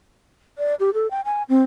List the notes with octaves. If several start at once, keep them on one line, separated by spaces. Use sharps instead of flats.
D5
G4
A4
G5
G#5
C4